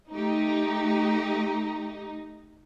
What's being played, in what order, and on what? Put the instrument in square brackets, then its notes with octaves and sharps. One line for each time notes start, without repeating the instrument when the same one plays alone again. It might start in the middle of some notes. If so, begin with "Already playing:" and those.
[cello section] A3 G4 [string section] D#4